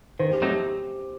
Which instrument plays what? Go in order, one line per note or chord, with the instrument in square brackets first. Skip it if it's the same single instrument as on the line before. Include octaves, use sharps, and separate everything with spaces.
[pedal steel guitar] D#3 [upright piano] C5
[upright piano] G4
[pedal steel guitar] F#3 A3 C4 D#4 [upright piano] G4